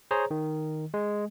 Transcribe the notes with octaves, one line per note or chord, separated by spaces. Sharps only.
G#4 C5 C#5 A#5
D#3
G#3